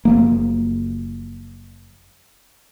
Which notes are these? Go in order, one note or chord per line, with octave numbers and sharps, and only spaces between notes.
F#1 F3 A#3